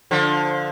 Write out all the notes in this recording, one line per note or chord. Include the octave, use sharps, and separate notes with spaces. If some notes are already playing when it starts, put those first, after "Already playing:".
D3 F3